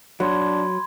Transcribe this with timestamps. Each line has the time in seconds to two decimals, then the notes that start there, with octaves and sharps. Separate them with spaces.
0.20 F#3 D4 B5 C6 G#6